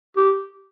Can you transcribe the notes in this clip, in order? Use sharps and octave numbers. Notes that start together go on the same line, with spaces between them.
G4